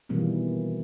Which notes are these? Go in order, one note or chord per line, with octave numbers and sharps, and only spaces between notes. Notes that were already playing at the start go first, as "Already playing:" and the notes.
B2 D#3 E3 G3 A#3 C4